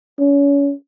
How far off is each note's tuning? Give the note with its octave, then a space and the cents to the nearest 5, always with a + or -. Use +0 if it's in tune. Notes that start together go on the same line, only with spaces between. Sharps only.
C#4 +30